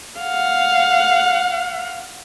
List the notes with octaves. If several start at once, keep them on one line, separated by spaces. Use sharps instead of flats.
F5 F#5